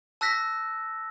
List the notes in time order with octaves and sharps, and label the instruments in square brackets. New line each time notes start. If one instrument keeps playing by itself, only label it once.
[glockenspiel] A5 E6 F#6 A#6 B6